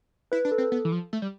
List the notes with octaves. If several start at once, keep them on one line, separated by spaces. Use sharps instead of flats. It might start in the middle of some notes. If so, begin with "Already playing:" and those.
E4 B4
D4
A4
C4
B3
E3
F3
A3
G3